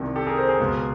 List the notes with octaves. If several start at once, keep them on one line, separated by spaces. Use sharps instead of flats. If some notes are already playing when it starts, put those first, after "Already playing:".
Already playing: C2 C3 D#3
G4 A4
G#4 A#4
A#4 C5
G#4 A#4
C#2 B2